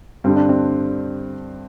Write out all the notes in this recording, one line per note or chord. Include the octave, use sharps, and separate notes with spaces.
G2 D3 G3 C4
D4
C4